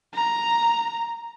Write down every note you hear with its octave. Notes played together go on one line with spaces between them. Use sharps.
A#5